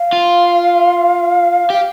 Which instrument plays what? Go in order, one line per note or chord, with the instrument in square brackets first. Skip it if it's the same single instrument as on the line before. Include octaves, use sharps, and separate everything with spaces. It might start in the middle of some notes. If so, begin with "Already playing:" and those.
Already playing: [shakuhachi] F5
[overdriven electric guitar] F4
[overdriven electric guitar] G4 [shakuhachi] F5